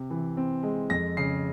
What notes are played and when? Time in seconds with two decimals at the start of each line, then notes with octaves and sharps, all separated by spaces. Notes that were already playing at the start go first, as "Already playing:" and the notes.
Already playing: C3
0.10 E3
0.37 C4
0.63 G#3
0.90 F2 A#6
1.17 C#3 C7